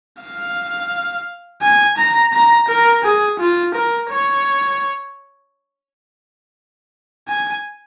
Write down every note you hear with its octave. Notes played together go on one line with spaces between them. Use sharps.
F5
G#5
A#5
A#5
A#4
G#4
F4
A#4
C#5
G#5